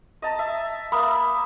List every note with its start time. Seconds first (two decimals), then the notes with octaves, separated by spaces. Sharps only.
0.22 D#5 A5 A#5
0.39 E5
0.92 A#3 E5 B5 D#6